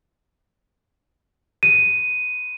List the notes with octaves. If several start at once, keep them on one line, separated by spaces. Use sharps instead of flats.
D#7